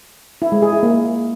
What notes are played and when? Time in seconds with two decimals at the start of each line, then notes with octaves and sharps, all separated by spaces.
0.42 E4
0.52 G#3
0.62 G#4
0.73 E4
0.83 A#3